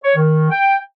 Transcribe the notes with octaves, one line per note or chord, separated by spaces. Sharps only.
C#5
D#3
G5